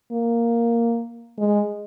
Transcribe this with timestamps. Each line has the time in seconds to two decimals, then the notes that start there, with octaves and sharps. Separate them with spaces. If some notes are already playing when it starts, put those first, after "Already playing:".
0.12 A#3
1.38 G#3